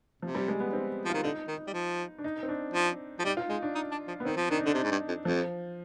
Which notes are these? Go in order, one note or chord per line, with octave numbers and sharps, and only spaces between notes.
C3 F3
G3
G#3
B3
C4
F3
D#3 F4
D3 D#4
D#3
G3
F3
D4
D#4
C4
D4
F3
F3
G3 D#4
F4
G#3 D#4
D4
D#4
D4
F3
B3
D#3 C4
F3
D#3 D4
D#4
D3 D4
C3 D#4
G#2
G2
F2
F2 F3